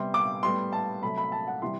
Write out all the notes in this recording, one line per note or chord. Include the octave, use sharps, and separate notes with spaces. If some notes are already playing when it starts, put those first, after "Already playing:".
Already playing: C3 G3 B3 C6
D6
A2 G3 B3 C6
A5
C3 F#3 A3 B5
B5
A5
F#5
C3 E3 G3 C6